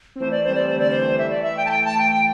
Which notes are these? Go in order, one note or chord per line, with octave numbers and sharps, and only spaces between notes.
C4
E3 A3 C5
D5
G3 C4 C5
D5
A3 C5
D3 G3 D5
D3 G3 C5
E3 A3
D3 G3 E5
E3 A3 D5
E5
G5
A5
G5
A5
G5
G5